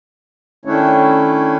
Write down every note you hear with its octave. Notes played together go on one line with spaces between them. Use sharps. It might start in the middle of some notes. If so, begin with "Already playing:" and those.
D#3 A3 C#4 D4 E4 C#5